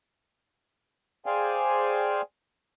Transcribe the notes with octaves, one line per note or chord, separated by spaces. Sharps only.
G#4 C5 D5 F5 G5 G#5